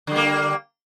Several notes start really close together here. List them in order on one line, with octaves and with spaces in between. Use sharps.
D3 G3 A#3